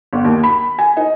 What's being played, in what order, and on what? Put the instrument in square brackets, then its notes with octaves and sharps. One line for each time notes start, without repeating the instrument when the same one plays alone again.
[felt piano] G1
D#2
B5
G#5
D#4